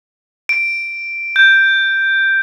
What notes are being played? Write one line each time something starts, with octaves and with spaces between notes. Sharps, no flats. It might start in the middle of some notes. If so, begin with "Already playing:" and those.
D7
G6